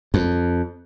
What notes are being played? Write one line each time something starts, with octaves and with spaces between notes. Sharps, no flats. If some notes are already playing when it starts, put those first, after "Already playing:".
F2